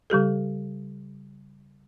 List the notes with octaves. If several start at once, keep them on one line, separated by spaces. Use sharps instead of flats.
C#3 G3 G4 A4